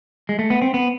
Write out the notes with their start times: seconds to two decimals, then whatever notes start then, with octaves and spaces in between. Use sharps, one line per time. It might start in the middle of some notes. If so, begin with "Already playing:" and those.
0.29 G#3
0.39 A3
0.50 B3
0.62 C4
0.74 B3